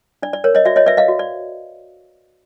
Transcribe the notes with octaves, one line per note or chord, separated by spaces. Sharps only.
D4 D5
D5
A#4 C#5
C#5 D#5
F#4 D5 E5
C#5 D#5
B4 D5 E5
D#5 F5
F#4
D5